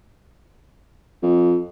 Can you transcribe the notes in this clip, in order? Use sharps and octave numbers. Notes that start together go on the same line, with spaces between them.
F2